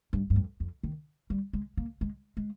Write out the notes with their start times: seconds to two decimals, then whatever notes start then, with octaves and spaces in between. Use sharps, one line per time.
0.13 G2
0.30 G2
0.36 F2
0.60 F2
0.83 D#3
1.30 G3
1.53 G#3
1.77 A#3
2.01 G#3
2.37 G#3